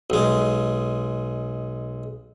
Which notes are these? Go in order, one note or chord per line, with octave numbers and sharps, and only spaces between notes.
B1 G#3